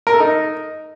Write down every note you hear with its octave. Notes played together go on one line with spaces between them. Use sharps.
A#4
A4
D#4